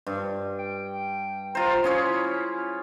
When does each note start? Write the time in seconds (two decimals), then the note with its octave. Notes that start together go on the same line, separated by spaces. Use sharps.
0.07 G2
0.59 G5
1.55 F4 C5 A#5
1.84 C#4 E4 G#4 C#5